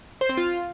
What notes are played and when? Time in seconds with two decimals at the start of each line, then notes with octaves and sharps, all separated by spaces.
0.21 C5
0.29 C4
0.37 F4